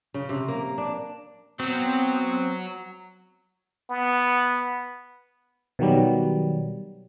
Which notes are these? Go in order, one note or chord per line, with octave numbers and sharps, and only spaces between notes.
C#3
C3
A#3
D4
F#3 B3 C4
B3
B2 D#3 F#3 G3